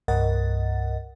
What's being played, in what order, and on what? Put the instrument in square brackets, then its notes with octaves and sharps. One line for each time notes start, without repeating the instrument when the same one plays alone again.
[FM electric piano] C2 G2 A#4 D#5 F#5 A6